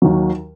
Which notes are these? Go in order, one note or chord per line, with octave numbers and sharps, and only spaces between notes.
D#2 D#3 F#3